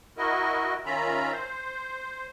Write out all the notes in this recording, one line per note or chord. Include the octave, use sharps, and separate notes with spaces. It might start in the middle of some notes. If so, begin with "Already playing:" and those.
E4 F#4 A#4 D#5
D#3 C#4 F4 E5 A#5 B5
C5